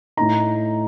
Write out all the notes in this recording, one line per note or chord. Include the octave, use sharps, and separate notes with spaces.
A2 A3 D#4 A#5